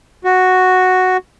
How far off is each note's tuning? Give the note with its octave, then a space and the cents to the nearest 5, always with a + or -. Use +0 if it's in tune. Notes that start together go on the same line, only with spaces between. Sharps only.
F#4 +0 C#6 +0